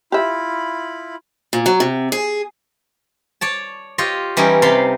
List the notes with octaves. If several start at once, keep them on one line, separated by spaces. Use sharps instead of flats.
E4 F4 G4 E5 B5
A#2
F#3
C3
G#4
C#5 D5 A5
F4 G4 C#5 D#5
E3 G3 C#4 D#4
C3 F5 A5 B5 C6